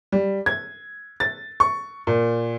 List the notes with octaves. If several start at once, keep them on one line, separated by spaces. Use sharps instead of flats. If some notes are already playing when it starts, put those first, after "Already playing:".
G3
G#6
A6
C#6
A#2